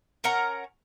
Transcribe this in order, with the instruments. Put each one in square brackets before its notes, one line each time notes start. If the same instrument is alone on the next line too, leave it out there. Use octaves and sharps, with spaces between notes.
[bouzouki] C#4 A#4 F#5 A#5